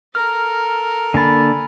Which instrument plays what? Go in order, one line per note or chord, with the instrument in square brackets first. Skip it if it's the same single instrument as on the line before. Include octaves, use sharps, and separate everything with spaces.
[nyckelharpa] A4 A#4 [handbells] F6
[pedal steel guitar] D3 A#3 A5 [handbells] G#5 B5